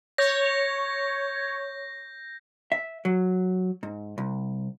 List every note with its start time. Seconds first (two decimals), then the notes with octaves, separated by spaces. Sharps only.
0.18 C#5 G6 A#6
2.72 E5
3.05 F#3
3.83 G#2
4.18 C2